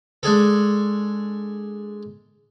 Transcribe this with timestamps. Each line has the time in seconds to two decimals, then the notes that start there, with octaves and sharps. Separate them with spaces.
0.23 G#3 D4 G#4 A4